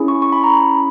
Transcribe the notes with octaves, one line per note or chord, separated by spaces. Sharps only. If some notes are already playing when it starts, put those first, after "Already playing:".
Already playing: C#4 E4 G#4
C#6
C#6
B5
A#5
B5